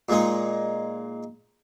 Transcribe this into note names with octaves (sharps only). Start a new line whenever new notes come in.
A#2 G#3 D#4